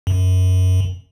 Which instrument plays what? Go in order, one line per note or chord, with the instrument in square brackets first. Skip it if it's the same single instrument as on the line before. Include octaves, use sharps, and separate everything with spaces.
[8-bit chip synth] F#2